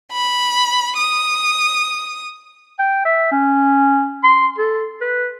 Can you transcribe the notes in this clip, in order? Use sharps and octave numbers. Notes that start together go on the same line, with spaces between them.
B5
D#6
G5
E5
C#4
C6
A4
B4